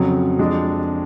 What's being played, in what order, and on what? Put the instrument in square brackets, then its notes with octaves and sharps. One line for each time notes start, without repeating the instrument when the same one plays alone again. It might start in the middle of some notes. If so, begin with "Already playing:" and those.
Already playing: [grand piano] F2 C#3 F#3
F2 F3 G#3 D4